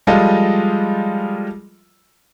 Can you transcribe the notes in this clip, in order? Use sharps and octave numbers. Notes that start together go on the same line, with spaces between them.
F3 G3 G#3 F4 A4 D#5